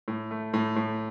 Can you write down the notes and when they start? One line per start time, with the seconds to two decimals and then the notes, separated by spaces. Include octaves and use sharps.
0.08 A2
0.31 A3
0.54 A2
0.76 A2